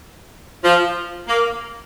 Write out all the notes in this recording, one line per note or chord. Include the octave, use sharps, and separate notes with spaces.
F3
A#3